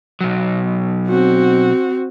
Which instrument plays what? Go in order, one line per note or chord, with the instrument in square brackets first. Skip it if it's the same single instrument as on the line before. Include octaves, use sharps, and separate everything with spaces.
[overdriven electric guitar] B1 F#3
[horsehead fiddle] C4 F#4